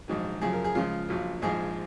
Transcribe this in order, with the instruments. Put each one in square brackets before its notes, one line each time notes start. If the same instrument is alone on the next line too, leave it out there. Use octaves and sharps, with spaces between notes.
[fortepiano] A#1 G#2 D#3 F#3
F#2 C#3 F3 G#4
A#4
G#4
C#2 C#3 F3 F4
A#1 A#2 F#3
A#1 G#2 F3 G#4